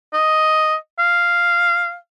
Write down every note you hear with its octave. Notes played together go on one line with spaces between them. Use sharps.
D#5
F5